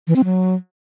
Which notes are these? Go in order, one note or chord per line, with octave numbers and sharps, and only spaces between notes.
E3
C4
F#3